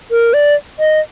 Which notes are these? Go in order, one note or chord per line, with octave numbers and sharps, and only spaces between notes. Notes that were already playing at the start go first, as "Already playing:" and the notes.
A#4
D5
D#5